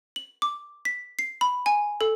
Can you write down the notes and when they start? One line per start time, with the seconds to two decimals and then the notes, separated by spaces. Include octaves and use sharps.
0.16 F#7
0.42 D6
0.85 B6
1.19 C7
1.41 B5
1.66 G#5
2.01 A4